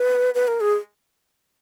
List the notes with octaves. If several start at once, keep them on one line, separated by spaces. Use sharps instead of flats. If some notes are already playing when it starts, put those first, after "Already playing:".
Already playing: B4
B4
A#4
G#4